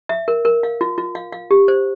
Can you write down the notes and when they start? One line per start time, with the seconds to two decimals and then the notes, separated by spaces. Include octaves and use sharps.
0.09 E5
0.28 A#4
0.45 A#4
0.63 F5
0.81 F4
0.98 F4
1.15 F5
1.32 F5
1.51 G4
1.68 C5